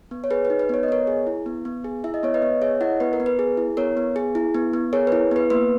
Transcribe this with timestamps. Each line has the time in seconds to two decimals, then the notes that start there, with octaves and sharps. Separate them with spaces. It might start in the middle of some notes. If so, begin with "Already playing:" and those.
0.11 B3
0.24 C#5
0.31 G#4 B4
0.45 B4
0.50 D#4
0.59 B4
0.69 B3 C#5
0.83 D#5
0.88 B3 A#4 C#5
1.07 G#4
1.27 E4
1.46 B3
1.65 B3
1.84 G#4
2.04 E4 E5
2.14 D#5
2.23 B3 C#5
2.34 B4 D#5
2.42 B3
2.61 G#4 C#5 E5
2.81 E4 D#5 F#5
3.00 B3 B4
3.13 A#4
3.20 B3
3.26 B4
3.39 G#4
3.57 E4
3.77 B3 A#4 C#5
3.97 B3
4.16 G#4
4.35 E4
4.55 B3
4.73 B3
4.93 G#4 A#4 C#5
5.07 B4
5.12 E4
5.31 B3 B4
5.50 A#3 B4